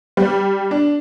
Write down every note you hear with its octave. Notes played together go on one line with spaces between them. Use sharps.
G3
D4